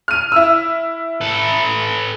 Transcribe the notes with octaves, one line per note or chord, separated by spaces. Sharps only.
F6 D#7
E4 E6
A4 B4